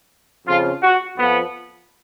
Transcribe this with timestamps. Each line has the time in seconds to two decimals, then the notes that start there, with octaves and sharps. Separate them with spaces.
0.46 F2 C#3 F3 F4
0.83 F#4
1.18 F2 F3 B3